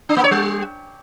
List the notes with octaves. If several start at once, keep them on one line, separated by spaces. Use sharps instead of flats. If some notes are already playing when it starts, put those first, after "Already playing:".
D4
A#3
C#5
G3